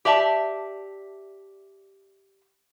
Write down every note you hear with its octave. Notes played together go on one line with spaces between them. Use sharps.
G4 D5 E5 A5